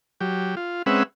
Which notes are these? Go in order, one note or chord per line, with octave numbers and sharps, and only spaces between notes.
F#3 G4
F4
G#3 C4 C#4 B4 E5 F#5